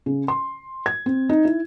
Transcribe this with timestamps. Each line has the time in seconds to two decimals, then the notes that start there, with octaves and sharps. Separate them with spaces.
0.06 C#3
0.28 C6
0.86 G#6
1.06 C4
1.29 D#4
1.45 E4